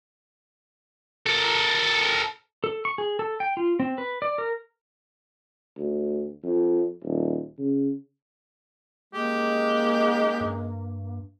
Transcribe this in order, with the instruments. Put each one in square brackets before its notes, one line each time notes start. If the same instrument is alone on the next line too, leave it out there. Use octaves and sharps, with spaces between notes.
[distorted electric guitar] A4 A#4
[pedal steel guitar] A4
C#6
G#4
A4
G5
F4
C4
B4
D5
A#4
[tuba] D2
F2
D#1
C#3
[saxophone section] G#2 C#3 G#3 [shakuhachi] A#3 [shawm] G4
[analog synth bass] G2